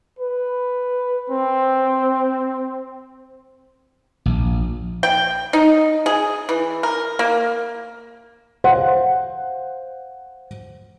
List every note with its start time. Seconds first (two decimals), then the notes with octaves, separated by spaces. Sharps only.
0.19 B4
1.30 C4
4.26 A#1
5.03 G5
5.53 D#4
6.06 G#4
6.49 E3
6.83 A#4
7.19 A#3
8.64 C5 F5 F#5